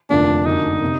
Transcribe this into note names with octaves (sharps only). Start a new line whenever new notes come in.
F1 D#2 D3 F3 A3 D4
F#1 F#2 D3 D#4
C3